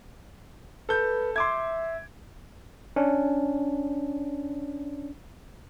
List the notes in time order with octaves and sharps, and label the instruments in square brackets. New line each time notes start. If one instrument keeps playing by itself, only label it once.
[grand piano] A4 G6 [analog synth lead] B4
[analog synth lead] E5 [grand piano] C6 D6 G#6
[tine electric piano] C#4 D4